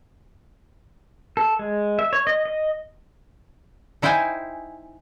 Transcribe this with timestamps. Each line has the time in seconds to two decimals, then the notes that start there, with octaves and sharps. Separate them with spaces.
1.37 A4
1.59 G#3
1.99 E5
2.13 C#5
2.27 D#5
2.45 D#5
4.02 D#4 E4 C5 F5 G5 G#5